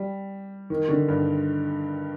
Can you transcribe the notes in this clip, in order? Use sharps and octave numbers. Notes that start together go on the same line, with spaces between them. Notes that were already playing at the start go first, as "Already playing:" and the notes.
Already playing: G3
D#3
D3
G2